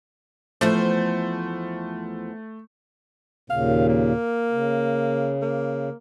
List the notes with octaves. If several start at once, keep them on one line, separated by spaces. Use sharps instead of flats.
E2 F3 A3 C5
D#2 A#2 C#3 F5
A#3
C#3
A#3